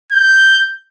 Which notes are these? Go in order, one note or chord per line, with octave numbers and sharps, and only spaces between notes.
G6